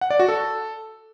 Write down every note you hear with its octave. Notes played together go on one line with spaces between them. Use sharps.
F#5
D5
F#4
A4